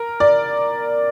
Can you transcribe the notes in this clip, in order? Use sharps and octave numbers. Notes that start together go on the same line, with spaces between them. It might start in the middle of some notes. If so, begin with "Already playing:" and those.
Already playing: A#4
D5